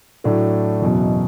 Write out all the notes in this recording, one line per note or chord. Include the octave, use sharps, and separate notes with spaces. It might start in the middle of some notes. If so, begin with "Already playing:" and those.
A2 F#3 A3 D4
F#1 E2 B2 F#3